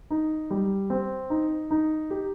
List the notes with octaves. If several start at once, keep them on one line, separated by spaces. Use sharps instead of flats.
D#4
G3
C4
D#4
D#4
G4